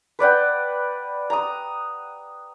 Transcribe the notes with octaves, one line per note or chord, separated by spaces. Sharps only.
B4 D5 F#5 G5
A#5 D#6